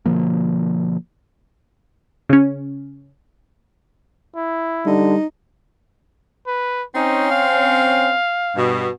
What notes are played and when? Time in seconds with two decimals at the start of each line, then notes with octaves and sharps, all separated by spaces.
0.06 B2 D3 F3 A#3
2.29 C#3 C#4
4.36 E4
4.86 D3 G3 D#4
6.47 B4
6.95 C4 C#4 D#4
7.31 F5
8.55 G2 B2